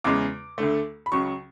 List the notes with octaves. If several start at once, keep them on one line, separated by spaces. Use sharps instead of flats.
E2 C#3 G#3 D6
D2 D3 A3
B5
C#2 C#3 F#3 C#6